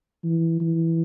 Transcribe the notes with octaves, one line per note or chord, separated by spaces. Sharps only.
E3
E3